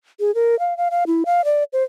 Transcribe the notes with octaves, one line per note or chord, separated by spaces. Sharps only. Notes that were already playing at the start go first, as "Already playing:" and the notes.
G#4
A#4
F5
F5
F5
E4
F5
D5
C5